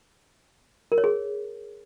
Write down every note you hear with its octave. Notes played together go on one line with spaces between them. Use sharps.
A#4
C#5
G#4